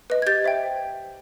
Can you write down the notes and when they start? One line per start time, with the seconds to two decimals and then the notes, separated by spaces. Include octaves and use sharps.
0.10 B4 D#5
0.22 G#6
0.26 G4 G6 A6
0.44 C5 E5 G5